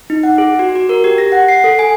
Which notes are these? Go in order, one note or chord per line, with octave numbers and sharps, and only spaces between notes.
D#4
F#5
G#4
F#4
F#4
A#4
G4
A#6
F#5
C7
A4
G#5